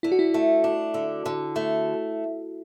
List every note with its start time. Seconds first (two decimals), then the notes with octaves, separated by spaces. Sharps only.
0.03 D3 E4
0.12 F#4
0.19 E4
0.34 A3
0.64 D4
0.94 D3
1.26 D3
1.56 A3